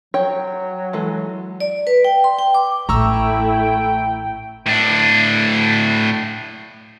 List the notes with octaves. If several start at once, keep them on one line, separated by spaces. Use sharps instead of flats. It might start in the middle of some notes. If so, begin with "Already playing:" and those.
F#3 C#5 G5
E3 G#3 A4
D5
B4
G5
C6
G5
D6
A1 A3 E4 G5 A#5 C#6 E6
A2 D4